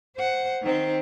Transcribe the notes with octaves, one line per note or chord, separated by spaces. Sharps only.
C5 F#5
D#3 C4